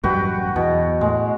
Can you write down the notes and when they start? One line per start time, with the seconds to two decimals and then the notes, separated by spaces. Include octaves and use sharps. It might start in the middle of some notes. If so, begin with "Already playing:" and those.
0.04 A1 F#2 G3 F#4 B4 G5
0.56 E2 B2
1.01 A2 G#3